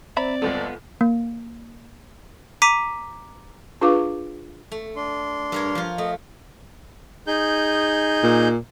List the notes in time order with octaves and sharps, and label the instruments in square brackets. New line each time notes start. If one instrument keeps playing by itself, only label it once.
[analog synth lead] C4 [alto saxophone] D5 [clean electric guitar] E5 A#5 B5
[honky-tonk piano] G1 C#2 A4 [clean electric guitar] B3
[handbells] A#3
[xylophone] A#5 D6 B6 D#7
[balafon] D4 F4 G#4 B4 F5 D6
[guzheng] A3
[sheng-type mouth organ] D4 C6
[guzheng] G2 A#4 C#5
F3 F4
[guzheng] A3 [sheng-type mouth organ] D#5
[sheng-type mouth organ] D#4 G#4 G6
[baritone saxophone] A#2